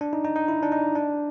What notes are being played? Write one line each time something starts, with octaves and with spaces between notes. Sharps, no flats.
D4
D#4
D#4
D#4
E4
D4
D#4
D4